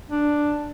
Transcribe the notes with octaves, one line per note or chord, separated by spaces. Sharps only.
D4